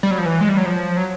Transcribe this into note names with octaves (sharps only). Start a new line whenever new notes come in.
G3
F#3
F3
E3
G#3
G3
F#3
F3
F#3